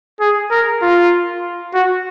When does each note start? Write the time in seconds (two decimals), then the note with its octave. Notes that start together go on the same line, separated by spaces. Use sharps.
0.20 G#4
0.51 A#4
0.82 F4
1.74 F#4